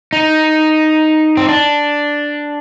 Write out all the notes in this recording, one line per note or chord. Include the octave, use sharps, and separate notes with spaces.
D#4
C4
D4